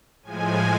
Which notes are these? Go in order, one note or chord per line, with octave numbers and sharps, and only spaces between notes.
A2 F3 G#3 G#5